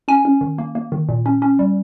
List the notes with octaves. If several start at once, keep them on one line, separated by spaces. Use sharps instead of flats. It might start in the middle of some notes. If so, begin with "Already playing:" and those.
C#4 G#5
C#4
D#3
A#3
A#3
D#3
A#2
C#4
C#4
G3